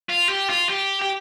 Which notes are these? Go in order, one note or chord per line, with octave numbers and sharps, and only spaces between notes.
F4
G4
F4
G4
G4